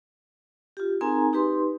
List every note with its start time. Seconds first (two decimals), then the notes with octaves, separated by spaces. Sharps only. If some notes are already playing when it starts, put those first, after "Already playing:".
0.77 F4 G4
1.01 C4 D#4 G#4 A#4 G#5 A#5
1.33 D#4 G4 B4 C6